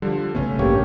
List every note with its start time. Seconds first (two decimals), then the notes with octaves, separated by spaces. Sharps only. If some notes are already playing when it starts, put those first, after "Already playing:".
0.02 D3 F3 G3
0.35 B1 C#3 A3 B3 C#4
0.59 A1 G2 C#3 A#3 G4 C#5